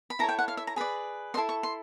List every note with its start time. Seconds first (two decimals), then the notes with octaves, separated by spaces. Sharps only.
0.10 B5
0.19 E4 A4 C#5 A#5
0.29 G5
0.39 F#5
0.48 F5
0.57 E5
0.67 A#5
0.76 G#4 B4 D5 B5
1.34 E4 A4 C5 D#5 C6
1.49 C#6
1.63 C6